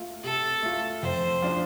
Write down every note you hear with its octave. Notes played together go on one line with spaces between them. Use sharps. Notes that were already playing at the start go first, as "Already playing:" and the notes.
Already playing: A3 F4
C3 A4
A3 F4
F2 C5
F3 D4 F4